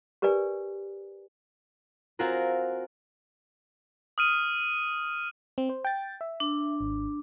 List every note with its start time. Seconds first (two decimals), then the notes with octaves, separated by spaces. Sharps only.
0.22 G4 A#4 B4 D5 G#5
2.19 C4 F4 F#4 G#4 A#4
4.18 D#6 F6 D#7
5.58 C4
5.69 C5
5.85 G5 A6
6.21 E5
6.40 D4
6.80 G#1